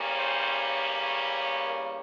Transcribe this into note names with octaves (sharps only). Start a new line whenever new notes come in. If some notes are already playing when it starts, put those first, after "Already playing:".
Already playing: E2 C#3 G3 A#3 C#4
C5
A#4